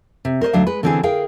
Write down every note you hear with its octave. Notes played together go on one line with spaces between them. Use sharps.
C3
A#4 C5 C#5 D#5
D2 F#3 D4 D#4 D5 F5
G#3 B4
D3 E3 C4 C#4 G#4
G#4 A#4 F5 G5